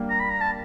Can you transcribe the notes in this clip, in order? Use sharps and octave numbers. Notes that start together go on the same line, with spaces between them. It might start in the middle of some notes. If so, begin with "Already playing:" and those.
Already playing: G3 A#3 D4 G4
A#5
B5
A#5
A5